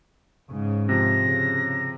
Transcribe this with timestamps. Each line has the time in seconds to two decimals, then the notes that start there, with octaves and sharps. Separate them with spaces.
0.50 G#2 C#3
0.89 C3 F3 A#6
1.23 C#3